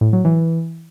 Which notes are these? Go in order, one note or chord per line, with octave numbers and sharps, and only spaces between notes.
A2
F#3
E3